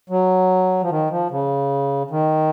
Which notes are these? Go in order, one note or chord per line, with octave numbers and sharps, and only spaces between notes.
F#3
F3
D#3
F3
C#3
D#3